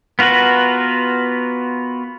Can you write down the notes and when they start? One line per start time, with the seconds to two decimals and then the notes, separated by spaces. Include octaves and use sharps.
0.19 B3 F4 F#4 A#4 B4